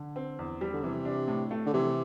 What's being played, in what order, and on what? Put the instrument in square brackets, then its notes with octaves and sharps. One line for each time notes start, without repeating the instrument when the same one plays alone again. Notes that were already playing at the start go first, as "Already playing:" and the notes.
Already playing: [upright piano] D3
C4
E2
G3
[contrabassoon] D3
[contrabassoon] C3 [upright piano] E3
[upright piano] D4
A2
A3
[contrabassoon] D3
[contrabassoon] C3 [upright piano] E3